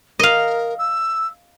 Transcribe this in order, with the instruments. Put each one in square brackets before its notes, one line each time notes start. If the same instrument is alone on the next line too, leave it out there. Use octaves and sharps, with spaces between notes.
[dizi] A#4 [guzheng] D#5 F5
[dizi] E6